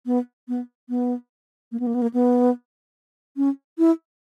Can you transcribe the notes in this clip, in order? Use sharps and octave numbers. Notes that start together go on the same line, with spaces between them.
B3
B3
B3
A#3
B3
A#3
B3
A#3
B3
C#4
E4